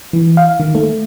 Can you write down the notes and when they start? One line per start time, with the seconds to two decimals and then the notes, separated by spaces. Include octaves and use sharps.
0.13 E3
0.37 F5
0.60 D#3
0.75 A3